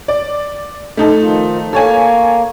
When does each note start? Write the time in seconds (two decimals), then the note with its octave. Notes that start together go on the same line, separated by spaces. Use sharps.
0.08 D5
0.97 A3 D#4 A4
1.22 D#3 F3 F4
1.73 A#3 A4 C#5 G#5